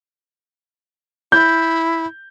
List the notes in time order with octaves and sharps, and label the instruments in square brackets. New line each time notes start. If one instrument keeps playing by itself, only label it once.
[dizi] E4 [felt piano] G6